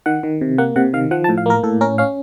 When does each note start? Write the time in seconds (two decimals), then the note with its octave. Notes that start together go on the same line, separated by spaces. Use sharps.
0.06 D#3 F#5
0.23 D#3
0.41 C3
0.58 A#3 F#5
0.76 C3 F#5
0.93 D#3 F5
1.11 F3 F#5
1.24 A5
1.29 A2
1.38 F5
1.46 A#3 A#4
1.63 A2 A4
1.81 C#4 A#4
1.98 C#4 F5